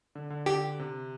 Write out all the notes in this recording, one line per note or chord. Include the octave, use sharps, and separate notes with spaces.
D3
D3
D3 G4
C3